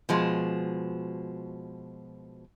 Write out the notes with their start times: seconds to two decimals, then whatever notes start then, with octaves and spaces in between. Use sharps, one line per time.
0.09 B2 F3 G#3